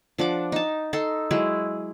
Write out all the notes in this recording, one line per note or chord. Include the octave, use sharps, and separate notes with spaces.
F3 D4 F#5 D6
D#4 A5
D#4 A4 C6
F#3 G#3 E4